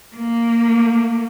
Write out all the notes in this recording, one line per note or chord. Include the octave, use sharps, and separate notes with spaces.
A#3